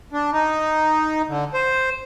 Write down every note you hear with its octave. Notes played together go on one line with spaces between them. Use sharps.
D4
D#4
D3
C5